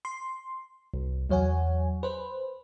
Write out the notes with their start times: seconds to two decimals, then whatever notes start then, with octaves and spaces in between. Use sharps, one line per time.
0.05 C6
0.94 C2
1.30 E2 F#3 C#5 F#5 G#5
2.03 B4 C5